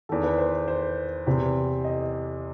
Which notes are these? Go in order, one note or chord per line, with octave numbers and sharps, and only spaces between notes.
E2 D#3 A4
B4
C5
C5
E2 C3 E3
D#5